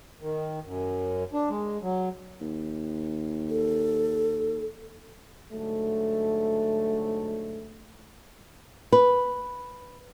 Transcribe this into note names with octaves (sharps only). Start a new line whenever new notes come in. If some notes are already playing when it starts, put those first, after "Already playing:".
D#3
F#2
D4
G#3
F#3
D#2
A4
G#2 D3 F#3 A3
B4